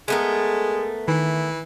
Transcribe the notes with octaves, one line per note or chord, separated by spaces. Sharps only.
G#3 A3 B3 A#4
D#3 E3